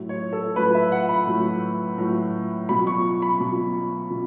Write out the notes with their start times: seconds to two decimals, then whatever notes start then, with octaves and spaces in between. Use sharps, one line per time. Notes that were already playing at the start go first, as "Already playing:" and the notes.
Already playing: A2 F#3
0.09 C#5
0.33 A4
0.56 A2 F#3 B4
0.75 E5
0.92 F#5
1.09 B5
1.27 A2 F#3
1.98 A2 F#3
2.69 B2 F#3 B5
2.87 C#6
3.22 B5
3.40 B2 F#3
4.10 B2